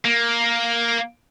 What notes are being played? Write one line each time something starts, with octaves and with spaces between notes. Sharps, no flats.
A#3